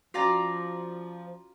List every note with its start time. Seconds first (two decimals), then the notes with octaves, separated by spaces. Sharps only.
0.14 F3 C#4 F4 F#4 D5 A#5